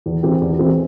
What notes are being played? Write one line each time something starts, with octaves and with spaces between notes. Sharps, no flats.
E2
E3 G#3 C4 G4
E2
E3 G#3 C4 G4